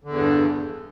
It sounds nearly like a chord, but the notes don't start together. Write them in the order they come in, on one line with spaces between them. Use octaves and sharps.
D3 E2 E3 G2